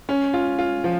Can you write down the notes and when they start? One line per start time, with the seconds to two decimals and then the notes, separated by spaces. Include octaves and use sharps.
0.09 C#4
0.34 F4
0.58 F4
0.84 F3